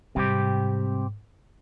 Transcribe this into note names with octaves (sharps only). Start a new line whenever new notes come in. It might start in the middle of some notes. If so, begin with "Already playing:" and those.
G#2 C3 G3 C4 G4